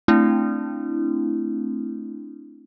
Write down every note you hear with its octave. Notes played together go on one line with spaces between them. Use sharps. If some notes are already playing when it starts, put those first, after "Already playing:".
A3 C4 D4 E4